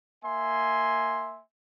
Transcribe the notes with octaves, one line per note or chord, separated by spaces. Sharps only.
A#3 E5 G#5 C6